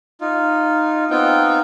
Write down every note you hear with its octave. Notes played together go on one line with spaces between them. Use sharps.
D#4 F4
B3 C4 D#4 F4 G5